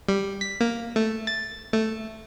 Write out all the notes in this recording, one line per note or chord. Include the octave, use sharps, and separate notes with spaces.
G3
B6
A#3
A3
A6
A3